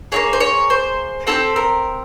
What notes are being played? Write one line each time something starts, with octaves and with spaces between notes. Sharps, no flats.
A#3 D#4 G#4 C#5
C5
C#5
C5
C4 E4 G4 A4
A#4